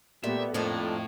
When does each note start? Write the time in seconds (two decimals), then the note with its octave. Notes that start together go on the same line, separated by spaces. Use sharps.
0.24 A#2 G3 A3 B3 G4 E5
0.54 F2 A2 F3 A#3 D4 D#5